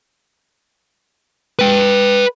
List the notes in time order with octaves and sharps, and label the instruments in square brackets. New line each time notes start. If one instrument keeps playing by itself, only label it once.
[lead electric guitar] B4 G5